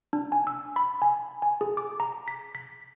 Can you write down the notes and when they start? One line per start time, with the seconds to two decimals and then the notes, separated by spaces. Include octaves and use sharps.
0.13 D4
0.32 G#5
0.47 E6
0.76 B5
1.02 G#5
1.42 G#5
1.61 G#4
1.77 D6
2.00 A#5
2.28 B6
2.55 B6